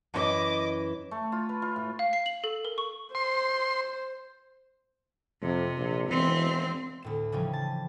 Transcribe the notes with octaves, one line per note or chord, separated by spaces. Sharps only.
F#2 E3 D#5 D6
A3
F4
B4
F4
A2
F5
C7
F#7
A4
A#4
C#6
C5 C6
F2 C3
A#1
E1 E3 C4
D2 A2 E7
C#3 E3 F3 G3 C4 C#4
A5